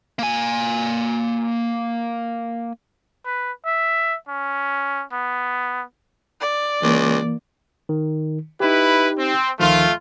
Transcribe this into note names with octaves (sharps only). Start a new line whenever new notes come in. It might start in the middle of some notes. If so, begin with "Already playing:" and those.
A#3 G#5
B4
E5
C#4
B3
D5
C#2 E3 A#3
D#3
D#4 E4 G4 B4
C4
D2 D#3 F3 A3 F4